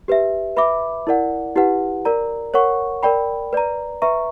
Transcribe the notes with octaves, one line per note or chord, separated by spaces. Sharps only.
G4 B4 E5
B4 E5 B5 D6
E4 A#4 D5 F#5
E4 G4 B4 F#5
A#4 D5 A#5
A#4 C#5 F#5 C#6
A#4 D5 G5 B5
B4 D5 A#5
B4 E5 A#5 C#6